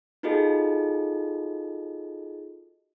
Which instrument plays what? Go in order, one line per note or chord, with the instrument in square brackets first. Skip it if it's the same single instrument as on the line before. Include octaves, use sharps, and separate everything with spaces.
[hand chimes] D#4 F4 F#4 G#4 A4 D#5